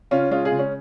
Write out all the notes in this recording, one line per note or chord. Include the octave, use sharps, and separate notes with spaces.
C#3 C#4 F4
G#3 C#4 F4
F4 G#4
C#3
C#4